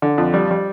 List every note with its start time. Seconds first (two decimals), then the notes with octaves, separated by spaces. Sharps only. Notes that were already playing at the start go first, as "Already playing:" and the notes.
0.02 D3
0.18 F2
0.34 G3
0.51 G3